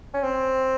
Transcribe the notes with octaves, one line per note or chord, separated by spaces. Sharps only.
C#4
C4